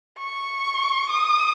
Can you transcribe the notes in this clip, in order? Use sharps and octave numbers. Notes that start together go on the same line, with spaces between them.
C#6
D#6